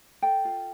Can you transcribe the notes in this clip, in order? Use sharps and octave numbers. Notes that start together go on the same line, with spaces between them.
A4 G5
F4